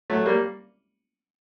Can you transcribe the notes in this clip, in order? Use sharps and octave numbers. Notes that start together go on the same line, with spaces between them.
F#3 A3
G3 A#3